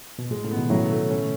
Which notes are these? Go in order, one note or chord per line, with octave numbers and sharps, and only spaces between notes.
B2
A2 G#3
A2 C#3
B3
B2 D#3
A2 C#3 F#3
A3
C#4